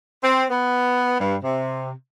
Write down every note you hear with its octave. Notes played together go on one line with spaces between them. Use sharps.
C4
B3
G2
C3